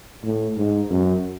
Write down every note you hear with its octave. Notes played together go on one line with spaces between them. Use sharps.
A2
G#2
F#2